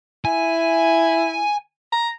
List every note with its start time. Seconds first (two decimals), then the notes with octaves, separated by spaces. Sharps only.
0.25 E4 G#5
1.92 A#5